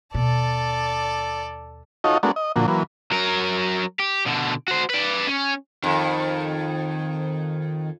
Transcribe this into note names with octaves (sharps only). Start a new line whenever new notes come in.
D#2 B2 A4 D5
D#4 F4 F#4 A4 C#5 D#5
G#3 A3 B3 D4 F#4 A#4
D#5
A#2 D3 F3 A#3 F#4
E3 F#3 A#3 B4
F#3 A#4
G4
B2 D3
F#4 C5
B4 D5
C#4
F2 D#3